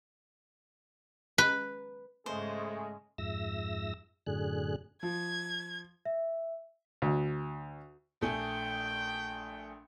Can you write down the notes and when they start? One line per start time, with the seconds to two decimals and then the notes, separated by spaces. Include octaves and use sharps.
1.38 B4
2.26 G#2 C#3 G#3 A3 G#4 C5
3.18 F2 G#2 E5 E6 A#6
4.27 F#2 A2 D3 G#4 F#6
5.03 F3 G#6
6.05 E5
7.02 D2
8.22 A#1 A3 G5 G#5